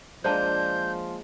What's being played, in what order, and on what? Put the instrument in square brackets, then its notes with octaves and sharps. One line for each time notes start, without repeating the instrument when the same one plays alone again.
[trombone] F3 [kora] G#3 A#3 D4 [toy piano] C5 A5 [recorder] G6